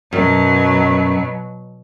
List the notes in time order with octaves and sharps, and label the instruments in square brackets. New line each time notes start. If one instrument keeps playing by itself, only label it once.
[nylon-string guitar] F#2 [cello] B2 F#3